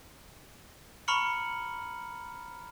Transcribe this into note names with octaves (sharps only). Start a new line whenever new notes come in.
A#5 B5 C#6 F6 C#7 F#7